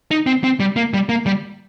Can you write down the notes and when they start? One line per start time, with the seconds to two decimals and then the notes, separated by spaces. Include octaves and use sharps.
0.11 D#4
0.26 C4
0.44 C4
0.60 G3
0.76 A#3
0.94 G3
1.09 A#3
1.26 G3